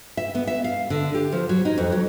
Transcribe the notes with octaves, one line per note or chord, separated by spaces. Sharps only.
E5
B3
E5
F5
D3
G4
F3
F#3
D#4
F2
F#3